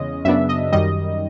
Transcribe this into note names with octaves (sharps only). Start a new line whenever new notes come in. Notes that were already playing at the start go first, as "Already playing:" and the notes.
Already playing: E2 C#3 G#3 C#4 D#5
F#2 C#3 F#3 B3 D4 E5
D#5
F#2 D#3 G3 D#5